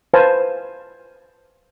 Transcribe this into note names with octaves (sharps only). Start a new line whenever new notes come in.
B4 C5 F5 G#5 A5